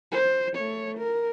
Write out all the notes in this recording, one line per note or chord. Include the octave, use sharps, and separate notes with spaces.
C5
A3 C#5
A#4